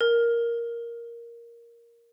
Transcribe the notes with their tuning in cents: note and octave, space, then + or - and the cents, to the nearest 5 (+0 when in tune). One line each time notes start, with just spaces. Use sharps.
A#4 +5